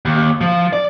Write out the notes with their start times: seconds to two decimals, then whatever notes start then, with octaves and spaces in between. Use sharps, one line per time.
0.05 D#2
0.41 F3
0.73 D5